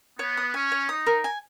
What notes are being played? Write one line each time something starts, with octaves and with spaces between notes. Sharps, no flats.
B3 C#5
D#6
C#4 G#5
C#5
D#4 D#6
A#4
G#5